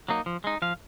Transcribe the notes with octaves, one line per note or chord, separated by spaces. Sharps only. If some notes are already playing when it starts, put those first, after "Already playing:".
F#3 A#3 D#4
F3
G#3 D#4
F3 F5